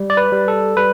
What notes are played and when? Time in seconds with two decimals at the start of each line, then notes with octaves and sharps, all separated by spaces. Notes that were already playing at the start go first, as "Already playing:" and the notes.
Already playing: G3
0.10 D5
0.17 B4
0.32 G3
0.48 A4
0.77 G3 B4